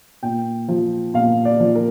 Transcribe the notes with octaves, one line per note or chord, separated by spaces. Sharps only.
A#2 G5
F3
A#2 F5
D5
F3
A#4